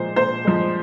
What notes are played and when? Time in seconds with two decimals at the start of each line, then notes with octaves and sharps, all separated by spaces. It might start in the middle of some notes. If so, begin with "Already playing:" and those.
Already playing: A#2 F3 G#3 C5
0.16 A#2 C5
0.45 F3 G#3